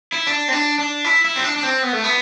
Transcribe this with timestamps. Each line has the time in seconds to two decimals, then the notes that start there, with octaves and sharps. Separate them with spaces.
0.12 E4
0.27 D4
0.48 C4
0.53 D4
0.78 D4
1.04 E4
1.24 E4
1.36 C4
1.44 D4
1.56 D4
1.63 C4
1.83 B3
1.93 A3
2.04 B3